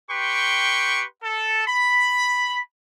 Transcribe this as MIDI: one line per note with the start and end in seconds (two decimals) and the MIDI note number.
0.11 1.05 67
0.11 1.05 71
0.11 1.05 79
0.11 1.05 84
0.11 1.05 85
1.23 1.66 69
1.67 2.60 83